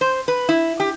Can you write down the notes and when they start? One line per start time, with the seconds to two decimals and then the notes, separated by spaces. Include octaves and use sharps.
0.01 C5
0.28 B4
0.49 E4
0.80 G4